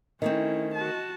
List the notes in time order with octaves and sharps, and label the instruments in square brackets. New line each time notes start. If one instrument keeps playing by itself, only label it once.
[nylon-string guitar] D#3 A3 C4 [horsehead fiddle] C#4 E4 [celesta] D#5
[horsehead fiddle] F#4 A5